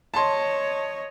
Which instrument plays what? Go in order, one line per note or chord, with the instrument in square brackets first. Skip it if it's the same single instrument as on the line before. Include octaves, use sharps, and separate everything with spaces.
[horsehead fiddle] C#5 D#5 [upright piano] A5 C6